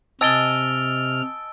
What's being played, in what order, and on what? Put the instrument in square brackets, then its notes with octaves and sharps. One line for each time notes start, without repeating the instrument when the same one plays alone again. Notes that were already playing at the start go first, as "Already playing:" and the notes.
[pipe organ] C3 F6 [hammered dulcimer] D#5 G#5 A5 [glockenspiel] E6 D7 G7